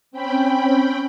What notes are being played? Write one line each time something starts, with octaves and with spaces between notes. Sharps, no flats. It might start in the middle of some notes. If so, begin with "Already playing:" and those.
C4 C#4 G5 B5